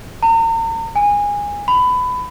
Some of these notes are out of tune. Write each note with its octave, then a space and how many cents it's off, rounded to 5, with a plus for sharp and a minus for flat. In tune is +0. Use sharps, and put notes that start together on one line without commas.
A#5 -40
G#5 -20
B5 +20